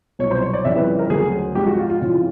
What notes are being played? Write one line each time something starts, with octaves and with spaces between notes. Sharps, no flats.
C2 B2 F#3 C#5
C5
C#5
D5
F2 C#3 E3 G3 E5
B4
A#4
D2 C#3 F#3 G#4
G#2 F3 G#3 G4
F#4
F4
F4
F2 C#3 E3